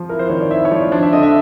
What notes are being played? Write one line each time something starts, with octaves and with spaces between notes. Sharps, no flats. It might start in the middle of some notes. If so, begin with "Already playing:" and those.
Already playing: F3
E4 A#4
C5
D#3 C#5
D5
E4 E5
C#5
F3 D5
D4 C5
E5
D3 D#5
E5